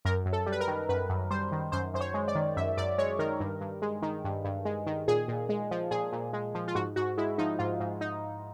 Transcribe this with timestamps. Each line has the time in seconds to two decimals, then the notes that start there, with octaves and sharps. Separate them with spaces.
0.05 F#2 A#4
0.26 F#2
0.33 A4
0.46 G3
0.52 B4
0.60 A#4
0.68 D#3
0.89 F#2 B4
1.09 F#2
1.31 G3 C5
1.52 D#3
1.72 F#2 C5
1.94 F#2 C5
2.01 C#5
2.14 G#3
2.28 D5
2.35 D#3
2.57 F#2 E5
2.77 F#2 D5
2.98 G#3 C#5
3.19 D#3 A#4
3.40 G2
3.61 G2
3.82 G#3
4.02 D#3
4.25 G2
4.45 G2
4.65 G#3
4.87 D#3
5.08 A#2 G#4
5.28 A#2
5.49 G#3
5.71 F3
5.91 A#2 G#4
6.12 A#2
6.33 G#3
6.55 F3
6.68 F4
6.75 G#2 F#4
6.96 G#2 F#4
7.17 G#3 E4
7.38 F3 D#4
7.59 G#2 F4
7.80 G#2
8.01 D#4